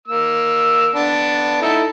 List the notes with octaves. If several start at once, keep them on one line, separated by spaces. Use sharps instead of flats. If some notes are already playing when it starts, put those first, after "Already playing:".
A#3 E6
B3 D4
D#4 E4 A4